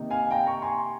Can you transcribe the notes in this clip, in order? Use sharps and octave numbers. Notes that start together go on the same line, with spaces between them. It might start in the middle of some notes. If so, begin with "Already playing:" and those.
Already playing: C3 D#3 A#3 D#4
F5 G#5
G5 A#5
A#5 C#6
G#5 C6